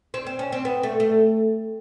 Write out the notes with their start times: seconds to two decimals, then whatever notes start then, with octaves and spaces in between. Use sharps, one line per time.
0.14 C4
0.26 C4
0.39 C#4
0.52 C4
0.65 B3
0.83 A3
1.00 A3